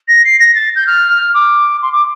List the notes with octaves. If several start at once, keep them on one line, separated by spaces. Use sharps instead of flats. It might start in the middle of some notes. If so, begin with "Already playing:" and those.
A#6
C7
A#6
A6
G6
F6
D6
C6
D6